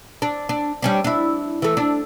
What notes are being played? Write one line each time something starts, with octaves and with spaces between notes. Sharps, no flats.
D4
D4
G3 C#4 D4
D4 E4
E3 A3
D4